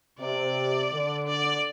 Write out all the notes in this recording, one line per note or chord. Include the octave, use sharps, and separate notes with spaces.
C3 D5
D3
D5